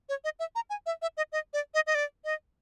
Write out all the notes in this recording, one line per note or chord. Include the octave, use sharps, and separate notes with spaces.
C#5
D#5
E5
A#5
G#5
E5
E5
D#5
D#5
D5
D#5
D#5
D5
D#5